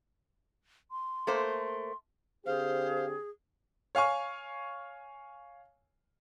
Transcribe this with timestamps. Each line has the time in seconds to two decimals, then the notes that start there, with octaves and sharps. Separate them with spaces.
0.91 C6
1.27 A3 A#3 C5
2.45 D3 C4 G4 G#4 C5 F5
3.95 C#5 F5 G#5 C#6